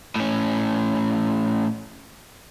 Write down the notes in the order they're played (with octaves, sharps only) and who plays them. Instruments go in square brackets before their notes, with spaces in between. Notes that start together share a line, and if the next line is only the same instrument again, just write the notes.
[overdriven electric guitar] A2 C#4